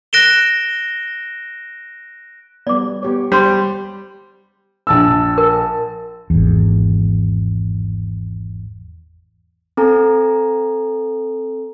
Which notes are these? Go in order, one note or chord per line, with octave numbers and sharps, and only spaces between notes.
F#6 A#6 D7 E7 G7
G3 B3 D5 D6
B3 G4 C#5
G3 C5 C6
A#1 A5 E6
A#4
G#1 E2
C4 A4 G#5 A#5